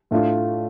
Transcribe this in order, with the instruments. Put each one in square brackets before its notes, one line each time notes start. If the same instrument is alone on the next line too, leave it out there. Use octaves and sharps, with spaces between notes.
[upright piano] A2 A3 D4 F4